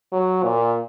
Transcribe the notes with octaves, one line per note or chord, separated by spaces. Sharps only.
F#3
A#2